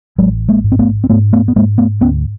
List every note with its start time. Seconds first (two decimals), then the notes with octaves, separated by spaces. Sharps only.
0.18 A1 F#3 G#3
0.49 G#3 A#3
0.64 G#2
0.72 C4
0.79 A3 B3
1.04 C4
1.09 G#2 A3 B3
1.33 A3 B3
1.48 B3
1.56 G#2 G#3 A#3
1.78 A3 B3
2.01 D2 B3 C#4